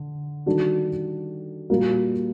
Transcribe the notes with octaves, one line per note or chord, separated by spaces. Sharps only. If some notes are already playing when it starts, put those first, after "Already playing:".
Already playing: D3
D#3 G3 D4 F#4 A4
A#2 G3 A#3 F#4 A#4